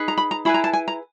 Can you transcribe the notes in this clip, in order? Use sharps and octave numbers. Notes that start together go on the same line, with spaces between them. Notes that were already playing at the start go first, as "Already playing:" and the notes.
Already playing: D#4 G#4 B4
A#5
B5
A#5
E4 G#4 B4 B5
A#5
A5
G#5
A#5